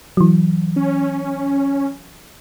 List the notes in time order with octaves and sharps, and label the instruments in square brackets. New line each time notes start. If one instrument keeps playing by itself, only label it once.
[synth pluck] E3 F#3
[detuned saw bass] C#4